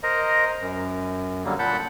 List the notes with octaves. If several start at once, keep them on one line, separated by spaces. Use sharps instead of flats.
A#4 C5 D#5 A#5
F#2
D3 F#3 G3 A#3
A#2 F#5 A5 B5 G6